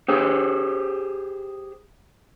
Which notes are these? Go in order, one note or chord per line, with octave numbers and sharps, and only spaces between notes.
G4 G#4 C5